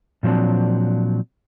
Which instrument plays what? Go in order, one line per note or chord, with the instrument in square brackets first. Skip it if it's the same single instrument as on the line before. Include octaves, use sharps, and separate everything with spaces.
[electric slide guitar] A#2 F3 F#3 C4 D4